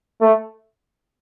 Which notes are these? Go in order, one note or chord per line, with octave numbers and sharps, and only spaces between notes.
A3